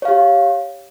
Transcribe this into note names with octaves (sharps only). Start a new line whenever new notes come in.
G4 C#5 F5